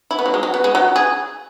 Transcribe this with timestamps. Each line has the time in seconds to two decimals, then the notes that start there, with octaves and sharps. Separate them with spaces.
0.11 E4
0.19 B3
0.26 F#3
0.34 G#3
0.43 F#3
0.54 B3
0.64 G#3
0.75 F#3
0.96 G#4